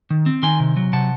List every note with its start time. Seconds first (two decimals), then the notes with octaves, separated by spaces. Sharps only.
0.10 D#3
0.26 C4
0.43 D#3 G#5 C6
0.60 C3
0.77 F#3
0.93 C3 F#5 A5